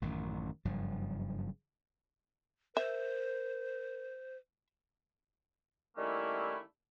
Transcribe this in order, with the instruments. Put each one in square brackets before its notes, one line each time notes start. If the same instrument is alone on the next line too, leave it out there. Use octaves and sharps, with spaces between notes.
[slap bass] A1 F#2 D#3
F#1 G2 F3
[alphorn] A#4 [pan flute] C5 [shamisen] E5
[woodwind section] D#3 G3 A3 A#3 C#4 E4